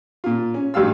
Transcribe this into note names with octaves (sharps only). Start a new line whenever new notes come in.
A#2 F4
C#4
A1 G2 F#3 F5 E6